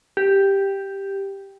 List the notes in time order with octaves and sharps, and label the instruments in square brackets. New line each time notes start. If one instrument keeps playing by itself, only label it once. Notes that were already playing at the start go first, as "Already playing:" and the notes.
[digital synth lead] G4